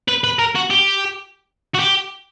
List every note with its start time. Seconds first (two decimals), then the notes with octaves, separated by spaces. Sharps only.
0.08 B4
0.24 B4
0.39 A#4
0.55 F#4
0.70 G4
1.75 F#4
1.80 G4